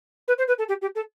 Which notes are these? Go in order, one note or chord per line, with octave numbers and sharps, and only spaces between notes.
B4
C5
B4
A4
G4
G4
A4